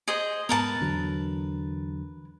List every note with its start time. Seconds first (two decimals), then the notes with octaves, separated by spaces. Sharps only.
0.08 G#4 C5 D#5
0.49 G#2 B3 A#4 B4 A5
0.81 E2 D3 F#3